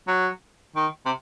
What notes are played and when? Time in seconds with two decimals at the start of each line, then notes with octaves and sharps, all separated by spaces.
0.07 F#3
0.76 D#3
1.05 C3